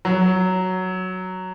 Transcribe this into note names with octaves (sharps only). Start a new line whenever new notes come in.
F#3